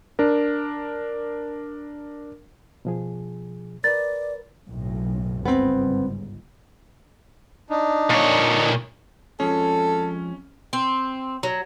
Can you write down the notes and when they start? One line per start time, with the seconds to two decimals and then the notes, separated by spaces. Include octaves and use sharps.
0.19 D4 A#4
2.85 B2 F3 G#4
3.84 A#4 B4 D5 A6
4.67 F#1 B1 A2
5.46 G1 C#2 G#2 B3 C4
7.70 D4 D#4
8.10 A#2 C#5
9.40 F2 F3 G#3 C#4 A4
10.73 C4
11.43 F#3